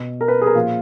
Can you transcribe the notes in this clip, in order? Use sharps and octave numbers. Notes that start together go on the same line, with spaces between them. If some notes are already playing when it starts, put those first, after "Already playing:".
Already playing: B2
A#4
B4
G#4
A#4
A#2 F3 F4